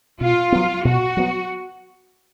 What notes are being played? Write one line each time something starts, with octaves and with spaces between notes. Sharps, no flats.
B2 F4
F#3 B3
B2 F#4
F#3 B3